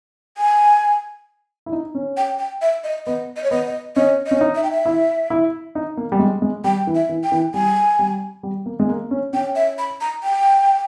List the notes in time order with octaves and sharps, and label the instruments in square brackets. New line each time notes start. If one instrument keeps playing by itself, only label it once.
[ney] G#5
[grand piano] E4
D#4
C#4
[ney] G5
G5
E5
D#5
[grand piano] B3 [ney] D#5
[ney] D#5
C#5
[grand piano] B3 [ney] D#5
[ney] D#5
[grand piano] C#4 [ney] D#5
[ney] D#5
[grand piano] C#4
D#4
[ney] E5
G5
E5
[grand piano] E4
E4
D#4
A#3
G3
G#3
G#3
[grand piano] G3 [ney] G5
[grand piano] E3
[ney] E5
[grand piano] E3
[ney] G5
[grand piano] E3
[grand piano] G3 [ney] G#5
[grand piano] G3
G3
A#3
G#3
A#3
C#4
[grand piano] C#4 [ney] G5
[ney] E5
B5
A#5
G5